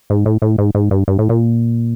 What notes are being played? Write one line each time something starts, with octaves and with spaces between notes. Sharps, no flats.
G#2
A2
A2
G#2
G#2
G2
G2
A2
A#2